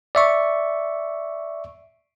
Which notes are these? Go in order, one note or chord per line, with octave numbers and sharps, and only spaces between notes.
D5 E5 C#6